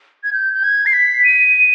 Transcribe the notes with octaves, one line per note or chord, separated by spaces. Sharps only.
G#6
G6
G6
G#6
C7
B6
D#7